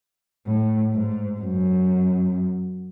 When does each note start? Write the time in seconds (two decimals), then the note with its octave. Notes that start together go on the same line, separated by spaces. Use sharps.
0.47 A2
0.93 G#2
1.40 F#2